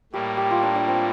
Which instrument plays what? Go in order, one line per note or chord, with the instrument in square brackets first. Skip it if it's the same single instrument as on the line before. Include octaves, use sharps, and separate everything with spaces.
[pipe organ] A2 G3 A#3 [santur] G4
[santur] G4
F4
D4
D4
C4